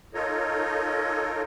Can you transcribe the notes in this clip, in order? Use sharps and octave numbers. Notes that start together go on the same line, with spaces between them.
D#4 F4 A4 A#4 C#5 D#5